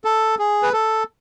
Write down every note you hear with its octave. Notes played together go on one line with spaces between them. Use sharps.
A4
G#4
B4
A4